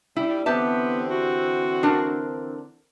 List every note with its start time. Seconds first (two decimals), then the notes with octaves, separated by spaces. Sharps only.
0.16 G3 E4
0.46 D3 E3 B3 C4 G4 E5 A5
1.11 F#4
1.83 D4 A#4